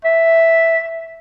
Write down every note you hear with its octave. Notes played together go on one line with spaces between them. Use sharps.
E5